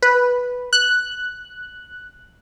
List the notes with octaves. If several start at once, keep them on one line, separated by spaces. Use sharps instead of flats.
B4
F#6